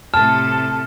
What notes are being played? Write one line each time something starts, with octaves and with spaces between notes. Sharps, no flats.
A2 C3 A4 A5 F6